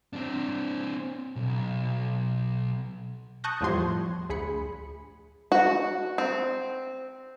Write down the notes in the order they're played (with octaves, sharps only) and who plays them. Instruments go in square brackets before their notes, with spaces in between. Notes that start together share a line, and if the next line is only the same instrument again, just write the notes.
[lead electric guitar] C4 D4
B1
[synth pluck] A5 C#6 D#6 F#6 G6 A#6
E2 A2 F3 G3 C6 G#6
D2 G#4 B5 C#7
[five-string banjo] F#4
C4